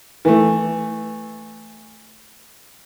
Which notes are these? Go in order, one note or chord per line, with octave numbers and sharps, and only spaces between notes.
E3 A3